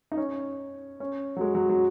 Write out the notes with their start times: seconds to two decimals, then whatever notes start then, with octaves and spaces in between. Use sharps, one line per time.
0.12 D#4
0.17 C#4
1.00 C#4
1.36 F#3
1.41 G#3
1.55 F#3
1.69 F#3